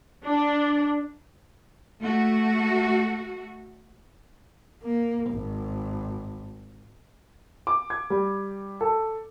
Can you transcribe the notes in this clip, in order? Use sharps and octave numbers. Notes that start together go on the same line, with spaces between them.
D4
A3 F#4
A#3
G#1
D6
G#6
G3
A4